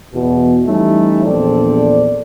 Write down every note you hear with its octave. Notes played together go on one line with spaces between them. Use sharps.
E2 B2
E3 G3 A3 C#4 D#4 E4
A#1 E2 C4 D4 A4 D5